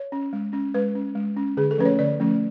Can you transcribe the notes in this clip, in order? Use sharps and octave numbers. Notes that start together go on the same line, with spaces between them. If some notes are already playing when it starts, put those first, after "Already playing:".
Already playing: C#5
C#4
G#3
C#4
G#3 B4
C#4
G#3
C#4
D3 G#4
A4
F3 A3 C#4 B4
C#5
D3 D5
F3 A3 C#4